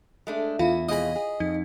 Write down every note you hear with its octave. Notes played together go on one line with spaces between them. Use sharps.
G#3 A3 D4
E2 E4 F4 F5
F2 B2 G#4 D#5 B5
G#4
F2 D#4